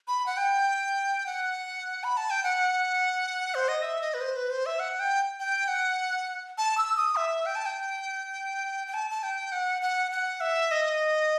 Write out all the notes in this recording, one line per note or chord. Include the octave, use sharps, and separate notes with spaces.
B5
F#5
G5
F#5
B5
A5
G5
F#5
C5
D#5
E5
D#5
B4
C5
B4
C5
E5
F#5
G5
G5
F#5
A5
E6
D#6
E5
G5
A5
G5
G5
A5
A5
G5
F#5
F#5
F#5
E5
D#5